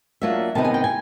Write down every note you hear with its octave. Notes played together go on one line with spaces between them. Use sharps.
F#3 A#3 D4 F4 E5
C3 D#3 G#3 B3 D#4 A5
G#5
G5
G#5